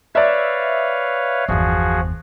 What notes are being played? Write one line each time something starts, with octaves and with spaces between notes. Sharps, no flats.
B4 C#5 D5 E5 F5
G1 E2 F3 F#4 G#4